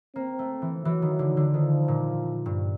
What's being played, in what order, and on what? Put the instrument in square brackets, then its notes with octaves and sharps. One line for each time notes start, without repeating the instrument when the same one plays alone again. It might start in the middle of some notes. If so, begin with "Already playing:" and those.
[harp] A#3 [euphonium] C4
[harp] A3
E3
[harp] E3 [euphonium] F#3
[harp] D#3
D3
D3
[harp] D#3 [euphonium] F3
[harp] A#2
G2